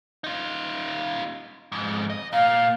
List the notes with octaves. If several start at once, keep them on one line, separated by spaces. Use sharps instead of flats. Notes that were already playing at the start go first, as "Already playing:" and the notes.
D#4 F4
F2 G#2
D#5
A#2 F5